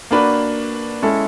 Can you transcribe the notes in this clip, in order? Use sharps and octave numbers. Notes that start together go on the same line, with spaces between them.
A#3 D4 F#4 B4
G#3 C#4 E4 A4